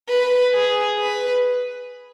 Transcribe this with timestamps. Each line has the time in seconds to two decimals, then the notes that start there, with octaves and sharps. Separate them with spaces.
0.09 B4
0.54 G#4
0.99 B4